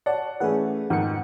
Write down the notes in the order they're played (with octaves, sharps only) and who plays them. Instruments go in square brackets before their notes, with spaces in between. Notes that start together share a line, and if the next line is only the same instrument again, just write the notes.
[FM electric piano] C#5 D5 A5 [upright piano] F#5
[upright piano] E3 A3 C#4 [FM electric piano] G#4 B4 F#5
[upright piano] F2 G#2 D#3 [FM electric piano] F#5 C#7